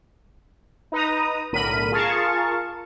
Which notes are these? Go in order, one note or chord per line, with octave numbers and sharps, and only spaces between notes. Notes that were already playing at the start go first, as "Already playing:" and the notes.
D#4 B4 A#5 D#6
B1 A2 D3 A#4 B5 D#7
F4 G#4 A#4 F5 A5 C#6